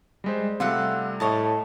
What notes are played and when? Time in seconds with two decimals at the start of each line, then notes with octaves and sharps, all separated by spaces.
0.24 G3 G#3 C5
0.60 C3 G3 A3 F4 E5 F#5
1.20 A2 C#5 D#5 A5